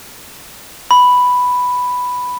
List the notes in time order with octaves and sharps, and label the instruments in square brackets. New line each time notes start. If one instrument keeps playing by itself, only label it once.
[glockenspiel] B5